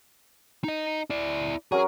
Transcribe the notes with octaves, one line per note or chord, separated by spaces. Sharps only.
D#4 D#5
E4 D5
F#3 C#4 G#4 A#4